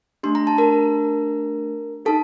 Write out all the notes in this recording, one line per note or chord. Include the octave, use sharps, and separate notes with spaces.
A3 D4 G4 C6
A#5
A5
A#4 A#5
D#4 G4 A4 A5